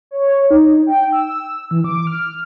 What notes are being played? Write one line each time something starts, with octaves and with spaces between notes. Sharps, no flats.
C#5
D#4
G5
E6
E3
D6
F6